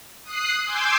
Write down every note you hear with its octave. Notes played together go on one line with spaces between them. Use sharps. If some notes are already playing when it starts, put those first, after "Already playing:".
D#6 F#6 C7
G#5 C6 D6 E6 G6